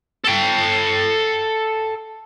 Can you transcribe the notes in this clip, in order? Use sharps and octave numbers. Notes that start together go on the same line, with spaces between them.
A4 G5